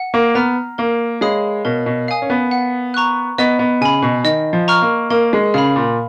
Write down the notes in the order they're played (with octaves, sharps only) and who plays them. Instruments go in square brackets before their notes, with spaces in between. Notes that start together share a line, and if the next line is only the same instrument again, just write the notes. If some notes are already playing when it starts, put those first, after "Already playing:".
Already playing: [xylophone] F#5
[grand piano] A#3
[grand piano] B3 [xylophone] A#5 F6
[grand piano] A#3 [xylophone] A#4
[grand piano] G#3 [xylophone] C#5 F5 B5 D#6
[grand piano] B2 [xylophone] A#4
[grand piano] B2
[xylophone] F5 G#5 D#6
[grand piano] C#4
B3
[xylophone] F#5
A#5 C#6 F#6
[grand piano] B3 [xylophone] D#5
[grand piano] B3
[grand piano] C#3 [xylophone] G#5 B5
[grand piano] B2
[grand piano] D#3 [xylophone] D#5
[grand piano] F3
[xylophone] A#5 C#6 F6
[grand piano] A#3
[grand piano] A#3 [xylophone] A#4
[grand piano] G#3
[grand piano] C#3 [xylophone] F5 B5
[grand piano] A#2